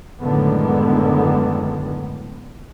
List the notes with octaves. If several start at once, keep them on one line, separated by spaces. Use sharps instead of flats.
F#2 A2 D3 D#3 G#3 B3